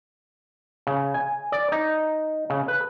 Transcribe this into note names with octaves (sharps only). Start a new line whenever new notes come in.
C#3
G#5
D5
D#4
C#3
B4